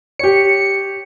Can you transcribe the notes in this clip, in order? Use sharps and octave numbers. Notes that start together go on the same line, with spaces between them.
G4 C#5 C#7